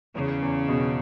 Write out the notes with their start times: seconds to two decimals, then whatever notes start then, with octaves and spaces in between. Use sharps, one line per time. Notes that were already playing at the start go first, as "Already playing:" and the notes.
0.15 E2 C#3
0.42 E2
0.68 B2